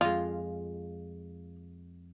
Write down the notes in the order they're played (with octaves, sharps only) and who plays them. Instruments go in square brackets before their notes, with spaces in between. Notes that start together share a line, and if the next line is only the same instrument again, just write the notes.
[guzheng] F2 G#3 [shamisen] F4